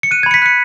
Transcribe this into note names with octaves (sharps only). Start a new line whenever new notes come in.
C#7
F#6 D#7
G#6
B5 C#7
B6
F#6 C#7